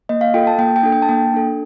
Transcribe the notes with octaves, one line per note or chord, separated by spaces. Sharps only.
A#3 D#5
F5
F4 A4 G5
A5
A#3 G5
G5
D4 A4
G5
A5
A#3 G5
D4 A4